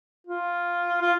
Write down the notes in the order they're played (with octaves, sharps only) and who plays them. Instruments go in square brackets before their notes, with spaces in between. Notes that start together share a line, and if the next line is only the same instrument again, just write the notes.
[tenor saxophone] F4
F4